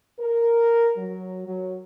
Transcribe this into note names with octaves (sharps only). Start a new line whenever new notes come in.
A#4
F#3
F#3